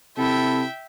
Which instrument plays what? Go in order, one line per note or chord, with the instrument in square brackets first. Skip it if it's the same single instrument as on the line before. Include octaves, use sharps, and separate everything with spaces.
[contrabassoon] C3 [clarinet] E4 [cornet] A4 [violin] E5 G5